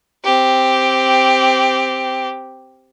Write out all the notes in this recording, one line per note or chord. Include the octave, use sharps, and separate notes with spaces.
C4 G4